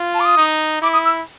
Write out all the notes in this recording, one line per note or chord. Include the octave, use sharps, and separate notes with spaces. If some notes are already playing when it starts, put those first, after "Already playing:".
Already playing: F4
A5
D6
D#6
D#4
E4 D6
D#6
E6